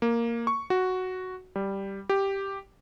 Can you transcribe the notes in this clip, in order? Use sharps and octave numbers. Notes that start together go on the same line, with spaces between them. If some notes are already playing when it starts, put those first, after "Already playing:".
A#3
C#6
F#4
G3
G4